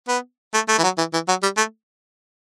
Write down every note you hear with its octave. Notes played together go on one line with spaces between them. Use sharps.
B3
A3
A3
E3
F#3
E3
E3
F#3
G3
A3